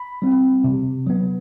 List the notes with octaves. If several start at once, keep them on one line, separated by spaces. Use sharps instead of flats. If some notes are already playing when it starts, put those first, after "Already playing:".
Already playing: B5
G3 C4
C3
F#3 B3